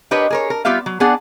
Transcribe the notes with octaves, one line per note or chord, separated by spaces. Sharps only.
D4 G4 A#4 B4 C#5 D#5
G#4 A#4 C#5
A#4
G3 B3 F4 G4 E5 F5
F#3
B3 D4 G#4 D5 F#5